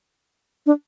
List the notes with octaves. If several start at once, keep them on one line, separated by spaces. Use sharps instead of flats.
D4